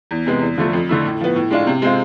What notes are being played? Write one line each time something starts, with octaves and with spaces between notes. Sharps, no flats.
E2
C3 G#3 B3
E2
D3 F3 A3
F2
D3 A3 E4
A2
F3 B3
A2
G#3 D4 F4
C3
G#3 C4 F4